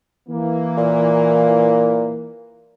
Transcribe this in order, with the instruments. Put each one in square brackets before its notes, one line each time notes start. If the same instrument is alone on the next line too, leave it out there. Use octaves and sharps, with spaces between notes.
[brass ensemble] E3 A#3
[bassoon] A#2